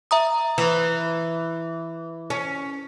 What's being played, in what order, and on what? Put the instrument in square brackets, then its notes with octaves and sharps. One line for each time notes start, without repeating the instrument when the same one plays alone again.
[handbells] E5 A#5 D#6
[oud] E3
C#4